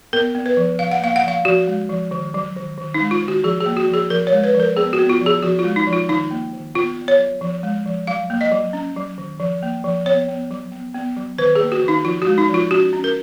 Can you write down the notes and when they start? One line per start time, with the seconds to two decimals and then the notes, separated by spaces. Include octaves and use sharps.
0.13 B3 A#4
0.35 B3
0.46 B4
0.57 F3
0.79 F3 F5
0.92 F#5
1.02 A#3 F5
1.16 F#5
1.23 F3 F5
1.45 F3 F#4
1.68 G#3
1.90 F3
2.11 D#3
2.34 F#3
2.56 D#3
2.78 D#3
2.94 D#4
3.00 G#3
3.11 F4
3.23 D#3
3.28 F#4
3.44 F3 G#4
3.60 G#4
3.66 A#3
3.77 F#4
3.88 F3
3.94 G#4
4.10 F3 A#4
4.27 C#5
4.32 G#3
4.44 B4
4.54 F3
4.60 A#4
4.77 B3 G#4
4.93 F#4
4.99 B3
5.10 F4
5.21 F3
5.26 G#4
5.43 F3 F#4
5.59 F4
5.65 G#3
5.76 D#4
5.87 F3
5.93 F4
6.09 D#3 D#4
6.31 A#3
6.53 D#3
6.75 B3 F4
6.97 B3
7.08 C#5
7.19 F#3
7.41 F3
7.63 G#3
7.86 F3
8.07 F#3 F5
8.30 A#3
8.41 D#5
8.52 F#3
8.73 C#4
8.96 F#3
9.18 D#3
9.40 F3
9.63 A#3
9.84 F3
10.06 B3 C#5
10.28 B3
10.51 F#3
10.72 B3
10.94 B3
11.16 F#3
11.38 D#3 B4
11.55 A#3 G#4
11.72 F#4
11.82 D#3
11.88 D#4
12.04 F3 F4
12.22 G#3 F#4
12.38 D#4
12.49 F3 F4
12.71 C#4 F#4
12.93 C#4
13.04 A#4